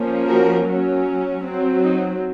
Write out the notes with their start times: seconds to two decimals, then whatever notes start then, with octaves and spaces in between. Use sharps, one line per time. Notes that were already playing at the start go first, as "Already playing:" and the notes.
Already playing: F3 A#3 C#4
0.27 F#4 A#4
0.67 F#3 C#4
1.44 F#3 C4
1.82 D#4